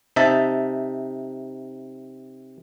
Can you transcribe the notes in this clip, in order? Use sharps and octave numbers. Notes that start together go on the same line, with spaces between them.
C3 D#4 E5 A5